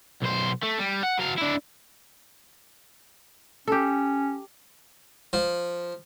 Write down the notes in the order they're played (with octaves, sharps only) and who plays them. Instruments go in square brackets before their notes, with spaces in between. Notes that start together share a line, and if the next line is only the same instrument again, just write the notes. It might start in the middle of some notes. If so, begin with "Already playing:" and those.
[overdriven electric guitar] B1 C5
A3
G3
F#5
F#3 F5
D4 E4
[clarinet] C#4 [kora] G4 A4
[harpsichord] F3